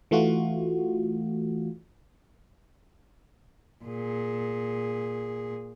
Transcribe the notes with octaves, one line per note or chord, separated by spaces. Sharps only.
E3 A3 F4 F#4
A#2 G#4